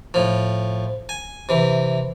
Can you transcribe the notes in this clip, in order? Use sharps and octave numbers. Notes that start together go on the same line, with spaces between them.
A2 F3
G#5
C3 E3